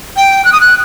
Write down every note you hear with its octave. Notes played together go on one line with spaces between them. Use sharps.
G5
F#6
D#6
F#6